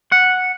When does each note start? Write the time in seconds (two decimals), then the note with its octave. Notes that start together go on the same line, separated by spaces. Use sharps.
0.12 F#5